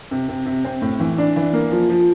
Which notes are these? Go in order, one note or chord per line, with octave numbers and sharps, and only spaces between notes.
C3
C3
C3
C4
A2
E3
D4
E3
A#3
F3
F3